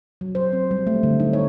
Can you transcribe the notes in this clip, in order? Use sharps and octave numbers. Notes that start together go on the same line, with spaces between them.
F#3
C5
C4
G3
A3
D3
D#4
C#5